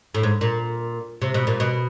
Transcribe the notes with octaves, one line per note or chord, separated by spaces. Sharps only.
A2
G#2
A#2
C3
B2
A#2
B2